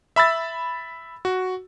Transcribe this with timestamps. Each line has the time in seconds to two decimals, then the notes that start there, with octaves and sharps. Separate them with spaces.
0.16 E5 B5 E6 A6
1.25 F#4